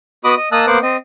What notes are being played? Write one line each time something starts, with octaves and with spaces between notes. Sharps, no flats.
B3 F#4 D#5 B5 D6 D#6
D#5
A#3 D#5 A5 D#6 E6 F#6
A#3 B3 C5 F#5 D6
C4 D#5